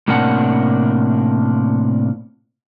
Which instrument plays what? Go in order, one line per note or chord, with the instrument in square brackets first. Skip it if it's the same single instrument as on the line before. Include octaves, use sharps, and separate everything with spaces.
[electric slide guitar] A2 C3 A#3 C#4 D4 F#5